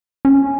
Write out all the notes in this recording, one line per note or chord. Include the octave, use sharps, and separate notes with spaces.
C#4